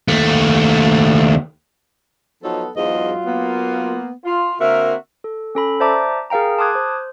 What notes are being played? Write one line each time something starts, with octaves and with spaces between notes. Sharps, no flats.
D#2 A3
F3 F#3 B3 D#4 A4
E2 G#2 F#3 F4 D#5
A#3 B3
F4
D3 A#3 C4 F#4 A#4 E5
A4
C#4 A4 B5
C5 D5 E5 A5 A#5 D6
G#4 A#4 F5 G5 A#5
A5 C6 D6 D#6 F#6 G#6
C5